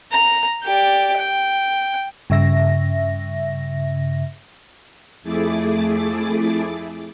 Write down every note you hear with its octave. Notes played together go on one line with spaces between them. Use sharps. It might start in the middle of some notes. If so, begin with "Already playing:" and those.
A#5
G4 D5
G5
G2 C#3 E5 A#6
F2 A3 E4 G#4 D6 A6